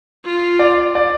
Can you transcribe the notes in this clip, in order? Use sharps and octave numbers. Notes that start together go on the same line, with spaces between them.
F4
D5
D5